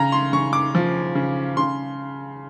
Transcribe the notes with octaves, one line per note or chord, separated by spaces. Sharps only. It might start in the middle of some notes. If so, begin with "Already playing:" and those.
Already playing: C#3 A#5
C6
C#3 C#6
D6
F3
C#3
C#3 C6